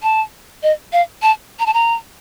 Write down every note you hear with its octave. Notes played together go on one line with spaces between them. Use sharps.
A5
D#5
F5
A5
A#5
A5
A#5